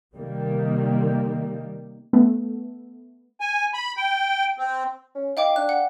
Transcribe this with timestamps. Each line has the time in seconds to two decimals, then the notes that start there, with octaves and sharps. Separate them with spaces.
0.14 C3 D#3 G3 A#3
2.13 A3 B3
3.41 G#5
3.74 B5
3.97 G5
4.58 C4
5.15 C#4
5.37 D#4 F5 G5 D6
5.56 D4 F#6
5.69 F#5